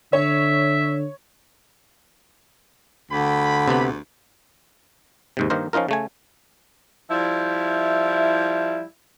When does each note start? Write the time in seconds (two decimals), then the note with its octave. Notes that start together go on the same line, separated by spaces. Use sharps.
0.13 D3 C#5 E5
3.11 D2 D3 G5 B5
3.68 C3 B3
5.37 D#2 G#2 C3
5.50 G2 D#3 A#3 D#4 A#4 C5
5.73 F3 C#4 D#4 F4 A#4
5.89 C#3 A3 G#5
7.10 F3 G3 E4